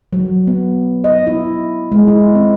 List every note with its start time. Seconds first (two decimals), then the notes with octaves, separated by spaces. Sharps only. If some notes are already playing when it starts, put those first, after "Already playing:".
0.13 F#3
0.47 B3
1.04 D#5
1.27 E4
1.92 G#3
2.07 E4
2.35 C4